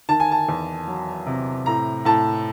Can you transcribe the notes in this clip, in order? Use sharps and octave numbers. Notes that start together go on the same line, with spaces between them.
D#3 A5
G#5
A5
E2
F#3
C3
A2 A#5
A2 A5